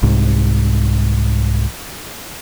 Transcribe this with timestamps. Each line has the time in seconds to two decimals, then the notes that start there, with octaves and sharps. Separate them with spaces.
0.03 C2 G#2